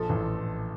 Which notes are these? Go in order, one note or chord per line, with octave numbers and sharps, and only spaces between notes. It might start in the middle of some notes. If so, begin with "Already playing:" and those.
Already playing: A#1 F3 A4
A1